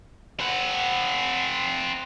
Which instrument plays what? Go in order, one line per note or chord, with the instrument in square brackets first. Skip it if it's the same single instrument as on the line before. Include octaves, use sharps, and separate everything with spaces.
[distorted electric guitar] C4 F#5